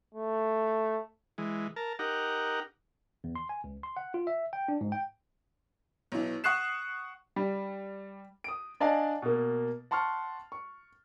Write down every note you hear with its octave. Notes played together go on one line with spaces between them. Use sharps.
A3
E3 G#3
A#4 A5
D#4 G4 A#4 F#5
E2
C6
G#5
C#2
C6
F#5
F4
E5
G5
D4
G#2
G5
B1 E3
F#5 C#6 D#6 F#6 C7 E7
G3
D#6 D7
D4 D5 D#5 F5 G#5 A5
B2 A#3
F#5 A5 C6 C#6 F6
C#6